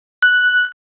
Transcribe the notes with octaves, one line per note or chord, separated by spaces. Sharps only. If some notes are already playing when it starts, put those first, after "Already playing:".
F#6